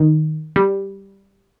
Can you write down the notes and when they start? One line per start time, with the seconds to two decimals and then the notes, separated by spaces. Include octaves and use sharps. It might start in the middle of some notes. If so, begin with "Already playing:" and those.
Already playing: D#3
0.56 G3